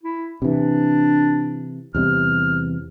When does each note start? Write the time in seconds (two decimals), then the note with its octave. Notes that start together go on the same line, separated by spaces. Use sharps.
0.03 E4
0.42 C3 E3 D4
1.95 E2 C3 G3 F6